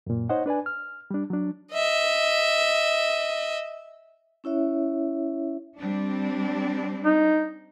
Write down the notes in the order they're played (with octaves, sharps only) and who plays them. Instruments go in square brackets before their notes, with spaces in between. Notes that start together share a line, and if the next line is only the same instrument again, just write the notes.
[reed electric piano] F#2 A#2
D#4 C5 C#5 D#5 F#5
D4 B4 D5 G#5
F6
G3 D4
F#3 D4
[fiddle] D#5 E5
[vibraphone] C#4 E4 C#5 E5
[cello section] G3 C4 D4
[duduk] D#4